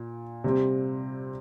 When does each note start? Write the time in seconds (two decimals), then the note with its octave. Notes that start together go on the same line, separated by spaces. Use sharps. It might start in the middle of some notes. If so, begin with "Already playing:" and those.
Already playing: A#2
0.44 C3 G3 C4